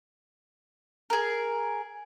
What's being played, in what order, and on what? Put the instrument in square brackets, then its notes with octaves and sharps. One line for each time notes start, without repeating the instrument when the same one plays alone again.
[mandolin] G#4 A#4